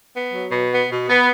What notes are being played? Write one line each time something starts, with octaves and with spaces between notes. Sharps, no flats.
B3
F#3
B2
B3
B2
B3